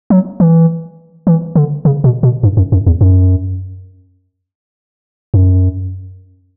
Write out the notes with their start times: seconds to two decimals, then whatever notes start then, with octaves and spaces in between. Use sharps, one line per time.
0.10 F#3
0.40 E3
1.27 E3
1.56 D3
1.85 C#3
2.04 B2
2.23 B2
2.43 G2
2.57 F#2
2.72 F#2
2.87 E2
3.01 F#2
5.34 F#2